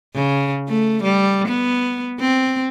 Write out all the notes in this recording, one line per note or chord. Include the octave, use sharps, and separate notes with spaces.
C#3
A3
G3
B3
C4